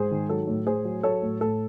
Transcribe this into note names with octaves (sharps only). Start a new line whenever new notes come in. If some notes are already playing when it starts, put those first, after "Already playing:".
Already playing: G#2 G#4 C5
D#3
F#3 A4
A2
A2 G#4 C5
F#3
F#3 A4 C#5
A2
A2 A4